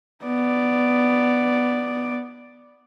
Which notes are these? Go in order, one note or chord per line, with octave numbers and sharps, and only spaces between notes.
B3 D5